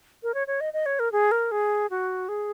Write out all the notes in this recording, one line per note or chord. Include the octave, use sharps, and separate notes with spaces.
A#4
C#5
C#5
D#5
D#5
C#5
A#4
G#4
A#4
G#4
F#4
G#4